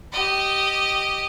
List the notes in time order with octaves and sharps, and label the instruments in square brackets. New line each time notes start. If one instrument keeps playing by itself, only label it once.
[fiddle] G4 D#5